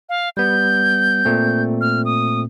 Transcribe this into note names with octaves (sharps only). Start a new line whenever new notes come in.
F5
G3 B3 G6
A#2 A3 C4
F6
D#6